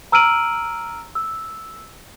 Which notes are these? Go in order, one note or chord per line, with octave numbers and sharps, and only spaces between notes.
A#5 E6 F6 D7 D#7 F#7
E6